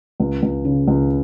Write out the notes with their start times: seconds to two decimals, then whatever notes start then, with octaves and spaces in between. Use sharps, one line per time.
0.20 C#2
0.42 C#2
0.65 C#3
0.88 C#2